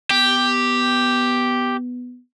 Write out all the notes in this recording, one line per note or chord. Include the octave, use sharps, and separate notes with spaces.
B3 G4